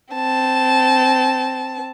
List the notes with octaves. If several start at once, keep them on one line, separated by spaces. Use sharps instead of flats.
C4 A5